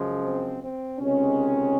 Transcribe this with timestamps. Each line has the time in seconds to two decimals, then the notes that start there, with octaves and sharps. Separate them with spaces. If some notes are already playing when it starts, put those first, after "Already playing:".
Already playing: F#2 C#3 F3 G#3
0.23 C4
0.62 C4
1.00 C#2 C3 D#3 G#3 C#4